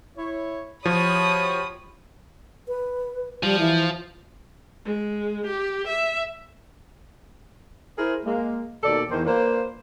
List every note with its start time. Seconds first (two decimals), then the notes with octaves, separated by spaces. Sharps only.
0.17 E4 C#5
0.85 F3 F#4 G4 C#5 B5 D#6
2.68 B4
3.43 F3 G3
3.59 E3
4.85 G#3
5.46 G4
5.87 E5
7.98 E4 G#4 A#4 C5
8.26 G#3 A#3
8.84 D#2 B2 A4 D5
9.11 E2 D#3 C5
9.25 A#3 D4 F4 B4 C5